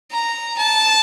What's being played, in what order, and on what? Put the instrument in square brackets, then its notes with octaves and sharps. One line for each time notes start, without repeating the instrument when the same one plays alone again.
[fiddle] A#5
A5